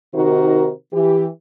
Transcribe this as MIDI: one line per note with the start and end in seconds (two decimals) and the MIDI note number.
0.15 0.70 48
0.15 0.70 51
0.15 0.70 63
0.15 0.70 66
0.15 0.70 70
0.15 0.70 72
0.93 1.26 52
0.93 1.26 67